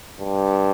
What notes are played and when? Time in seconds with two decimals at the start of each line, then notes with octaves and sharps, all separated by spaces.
0.20 G2